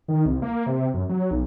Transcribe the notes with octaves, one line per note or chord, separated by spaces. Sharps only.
D#3
C2
A#3
C3
F#2
F#3
B1